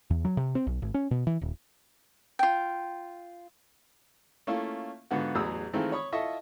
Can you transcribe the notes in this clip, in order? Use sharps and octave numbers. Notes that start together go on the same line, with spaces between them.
E2
F#3
C3
C4
B1
G#1
C#4
B2
E3
D#1
F4 G5
A3 A#3 C#4 E4 F4
G#2 D3 B3 F4 F#4
A1 E2 F#3 G#4 D#6 E6
D#3 E3 G#3 A3 C4 F4
C#5 B5 C#6 D#6
E4 F4 A4 D#5 E5 C#6